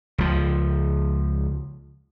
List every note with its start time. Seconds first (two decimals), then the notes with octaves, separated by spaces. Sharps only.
0.18 C#2 F3